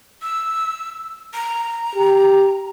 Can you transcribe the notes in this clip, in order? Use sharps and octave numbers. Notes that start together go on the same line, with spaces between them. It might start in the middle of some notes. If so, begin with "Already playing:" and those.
E6
A#5
G4